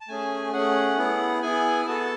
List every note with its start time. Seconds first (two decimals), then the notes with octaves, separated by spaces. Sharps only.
0.01 A5
0.08 A3 C#4 G#4 G#5
0.53 A3 C#4 G#4 F#5
0.98 B3 E4 G#4
1.42 B3 E4 G#4 G#5
1.86 B3 F#4 A4 A5